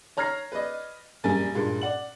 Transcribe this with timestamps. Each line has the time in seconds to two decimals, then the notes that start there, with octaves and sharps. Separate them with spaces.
0.17 C#5 A#5 F6 G#6 A#6 C7
0.52 B4 D5 D#5
1.24 A#1 F#2 G3 A#4 G#5 A6
1.54 G2 A#2 G#3
1.81 D5 F#5 F#7